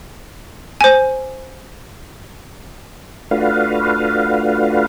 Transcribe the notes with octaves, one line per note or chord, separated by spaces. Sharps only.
C5 G#5
A3 D4 F4 F#4 B4 F5